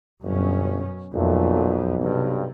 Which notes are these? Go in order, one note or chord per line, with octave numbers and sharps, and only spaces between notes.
G1 F#2 B2 C#4
B1 F2 A#2 A3
G2 C3